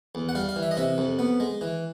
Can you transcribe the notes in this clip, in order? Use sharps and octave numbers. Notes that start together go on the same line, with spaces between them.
E2
F#5
G3 F5
F5
E3
E5
D#5
C3 E5
F2
B3
G#3
E3